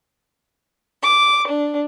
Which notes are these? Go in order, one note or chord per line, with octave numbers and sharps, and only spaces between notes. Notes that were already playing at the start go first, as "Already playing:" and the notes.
D6
D4